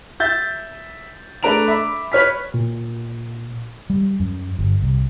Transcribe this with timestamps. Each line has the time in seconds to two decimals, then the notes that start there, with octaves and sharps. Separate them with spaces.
0.20 E5 G6 A6
1.43 A3 D4 B4 A#5 D7 F7
1.68 E5 B5 D6
2.12 B4 C#5 F6 B6
2.54 A#2
3.90 G3
4.20 F#2
4.59 G1
4.82 C2